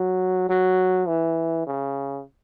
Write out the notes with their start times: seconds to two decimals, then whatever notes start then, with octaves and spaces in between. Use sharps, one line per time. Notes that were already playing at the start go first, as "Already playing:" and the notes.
Already playing: F#3
0.50 F#3
1.08 E3
1.67 C#3